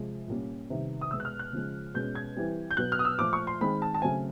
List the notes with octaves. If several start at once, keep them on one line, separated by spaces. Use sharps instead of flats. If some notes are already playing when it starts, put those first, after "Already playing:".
Already playing: C3 F3 G#3
A#2 G3 A#3 C#4
C3 D#3 G3 B3
D#6
B2 G#3 B3 E6
F#6
F6
F#6
C#3 F3 G#3
B2 G#3 C#4 G6
G#6
E3 G3 C4
G6
B2 F#3 B3 F#6
F6
D#6
E6
A#2 F3 A3 D6
C#6
C6
D#3 G#3 C4 B5
A5
A5
C#3 F#3 A3 C4 G#5